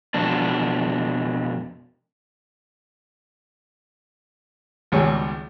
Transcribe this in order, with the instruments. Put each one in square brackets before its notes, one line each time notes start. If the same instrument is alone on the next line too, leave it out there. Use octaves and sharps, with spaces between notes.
[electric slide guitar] F2 B2 D4
[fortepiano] G#1 C#2 B2 G3 C#5 G#5